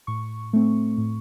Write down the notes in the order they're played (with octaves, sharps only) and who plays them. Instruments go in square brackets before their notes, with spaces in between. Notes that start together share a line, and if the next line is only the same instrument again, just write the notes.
[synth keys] A2 C#6
A3 C4
A2